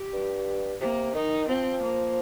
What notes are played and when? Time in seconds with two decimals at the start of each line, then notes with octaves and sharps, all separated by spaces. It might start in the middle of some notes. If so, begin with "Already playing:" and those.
Already playing: G4
0.13 G2
0.81 C3 A#3
1.15 D#3 D#4
1.48 F3 C4
1.82 A#3